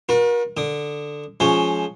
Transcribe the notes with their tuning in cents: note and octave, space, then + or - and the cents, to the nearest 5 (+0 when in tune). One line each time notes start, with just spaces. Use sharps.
F#4 -40 A#4 +40
D3 +5 D#6 -5
F3 +5 G#3 +20 C#4 +0